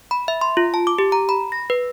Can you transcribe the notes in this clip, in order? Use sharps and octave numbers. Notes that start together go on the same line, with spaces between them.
B5
E5
C6
F4
A5
D6
G4
A#5
B5
A#6
B4